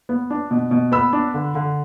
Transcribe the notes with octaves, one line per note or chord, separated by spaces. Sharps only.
B3
D4
B2
B2
B3 B5 E6
D4
D3
D3